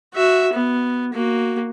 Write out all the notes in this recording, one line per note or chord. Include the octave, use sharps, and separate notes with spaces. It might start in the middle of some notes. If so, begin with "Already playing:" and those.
F#4 E5
B3
A#3 F#4